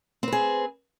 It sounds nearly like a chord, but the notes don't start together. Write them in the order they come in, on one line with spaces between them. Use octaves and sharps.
C4 B4 G#4